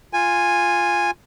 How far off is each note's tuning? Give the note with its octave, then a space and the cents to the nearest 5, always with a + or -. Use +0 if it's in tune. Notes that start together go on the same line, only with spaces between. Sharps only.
F4 +0 G#5 -10